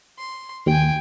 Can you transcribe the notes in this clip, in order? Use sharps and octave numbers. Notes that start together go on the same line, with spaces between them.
C6
D#2 G5 G#5